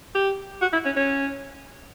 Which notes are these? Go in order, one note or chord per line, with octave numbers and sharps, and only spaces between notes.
G4
F#4
E4
C#4
C#4